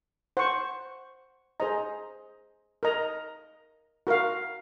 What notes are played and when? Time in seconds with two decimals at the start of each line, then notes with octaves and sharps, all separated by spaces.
0.37 C5 F#5 C#6
1.60 G#4 C5 D#5 A#5
2.83 A#4 D#5 A#5
4.07 F#4 A#4 F5